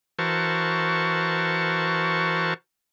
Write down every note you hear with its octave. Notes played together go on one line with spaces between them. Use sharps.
E3 F#4 A#4 C5 A5 C#6